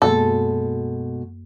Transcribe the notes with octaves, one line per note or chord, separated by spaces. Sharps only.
F#2 B2 G#3 A#3 A4